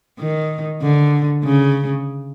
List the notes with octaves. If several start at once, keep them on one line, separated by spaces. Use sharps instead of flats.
D#3
D3
C#3